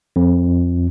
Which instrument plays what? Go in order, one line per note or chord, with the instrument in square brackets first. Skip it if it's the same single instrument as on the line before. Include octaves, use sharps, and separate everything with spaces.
[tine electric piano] F2